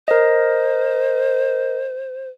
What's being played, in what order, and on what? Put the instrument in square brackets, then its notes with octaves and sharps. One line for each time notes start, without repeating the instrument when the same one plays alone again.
[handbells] A#4 D#5 [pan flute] C5